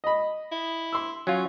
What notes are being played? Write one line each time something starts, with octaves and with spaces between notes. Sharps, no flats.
D#5 B5
E4
C6 E6
F#3 C#4 F4